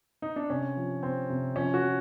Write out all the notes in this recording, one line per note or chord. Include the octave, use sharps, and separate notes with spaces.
D#4
D4
C3 C#4
F3
C3 C4
C3
F3 C#4
F#4
F3